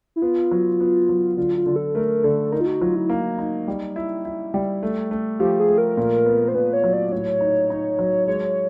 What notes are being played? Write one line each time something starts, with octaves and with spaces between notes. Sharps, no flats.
E4
B3 F4
F#3
B3
F#3
D3 F4
F4
D3
A4
A3 A#4
D3 A4
D#4 A#4
F4
F#4
F#3 F4
E4
A#3
D#4
G3
E4
E4
G3
A3
A3
F3 G4
G#4
A3
A#4
A#2
B3
C5
A#2 B4
C#5
F#3
D5
A2 C#5
D#4
D#4
F#3
G#3 C#5